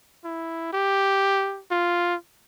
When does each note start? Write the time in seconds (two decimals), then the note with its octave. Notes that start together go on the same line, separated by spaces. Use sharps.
0.24 E4
0.73 G4
1.71 F4